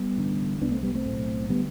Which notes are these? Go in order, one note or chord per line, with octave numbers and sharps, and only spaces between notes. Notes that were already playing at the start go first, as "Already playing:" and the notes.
Already playing: G3 B3
A1 G2 D3
C2 B2 B3 D4
A3 C4
G3 B3
A3 C4
B1 A2
D3 G3 B3